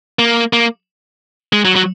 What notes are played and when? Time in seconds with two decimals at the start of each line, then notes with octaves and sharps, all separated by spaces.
0.19 A#3
0.53 A#3
1.53 G#3
1.65 F#3
1.76 F#3